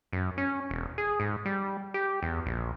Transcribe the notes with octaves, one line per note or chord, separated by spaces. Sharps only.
F#2
C#4
E1
G#4
G#2
G3
G4
E2
A#1